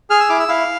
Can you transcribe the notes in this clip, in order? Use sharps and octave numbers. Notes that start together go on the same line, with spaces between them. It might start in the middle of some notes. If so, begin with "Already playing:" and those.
G#4 F6
E6
E4 D6
E6
E4 F5